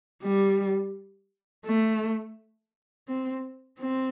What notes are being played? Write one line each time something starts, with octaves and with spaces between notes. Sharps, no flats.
G3
A3
C4
C4